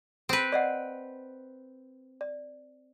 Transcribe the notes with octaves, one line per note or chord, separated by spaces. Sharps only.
C4 B4
D5 D#5 F#5
D5